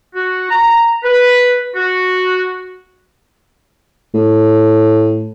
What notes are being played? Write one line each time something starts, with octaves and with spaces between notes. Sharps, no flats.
F#4
A#5
B4
F#4
A2